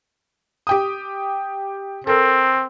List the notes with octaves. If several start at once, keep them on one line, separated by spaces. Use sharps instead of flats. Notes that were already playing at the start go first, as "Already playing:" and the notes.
G4 G5 D#6
C4 A4 A#4